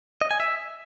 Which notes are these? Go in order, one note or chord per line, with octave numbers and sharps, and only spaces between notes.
D#5
G#5
E5